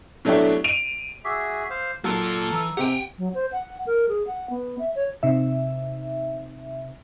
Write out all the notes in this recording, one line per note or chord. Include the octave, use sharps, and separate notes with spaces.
B2 F#3 A3 D4 E4 G4
D7 D#7 F7
F#4 G#4 E5 D6 E6
C5 F5
F#3 A#3 F4 A4 F6
A5
E3 A#5 E6
C3 G4 F#5 G5
F#3
C5
F#5
A#4
G#4
F#5
B3
E5
C#5
C3 D#4 E5